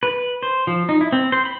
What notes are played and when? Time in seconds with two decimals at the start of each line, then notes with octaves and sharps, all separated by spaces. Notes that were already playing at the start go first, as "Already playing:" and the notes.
0.03 B4
0.43 C5
0.67 F3
0.89 D#4
1.01 E4
1.12 C4
1.32 C5
1.45 B5